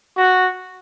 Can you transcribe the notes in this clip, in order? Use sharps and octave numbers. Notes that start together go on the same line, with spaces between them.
F#4